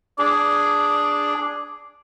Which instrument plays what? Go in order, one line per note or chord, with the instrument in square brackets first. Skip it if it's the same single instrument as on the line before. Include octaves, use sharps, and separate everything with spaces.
[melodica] D4 G#4 [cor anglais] D5